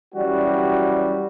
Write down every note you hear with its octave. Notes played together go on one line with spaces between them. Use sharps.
E3 F#3 G3 C#4 F#4 G4